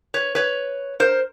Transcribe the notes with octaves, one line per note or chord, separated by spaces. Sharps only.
B4 C#5
B4 C#5
A#4 C5